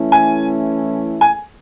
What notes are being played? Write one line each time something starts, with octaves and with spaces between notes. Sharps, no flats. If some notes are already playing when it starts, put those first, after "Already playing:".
Already playing: E3 A3 C#4 E4
G#5
G#5